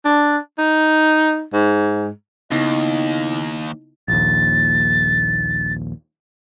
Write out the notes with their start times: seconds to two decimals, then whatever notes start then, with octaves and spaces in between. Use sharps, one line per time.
0.05 D4
0.58 D#4
1.53 G#2
2.51 D#2 C#3 B3 D#4 E4 D#5
4.08 A#1 D#2 A6